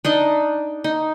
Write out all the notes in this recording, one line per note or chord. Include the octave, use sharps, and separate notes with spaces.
D4 D#4 D#5
D#4